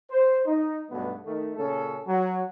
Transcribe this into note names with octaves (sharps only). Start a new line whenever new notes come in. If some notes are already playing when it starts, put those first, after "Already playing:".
C5
D#4
B1 G2 B2 A3 B3
D#3 A3
A#2 C#3 C#4 A4
F#3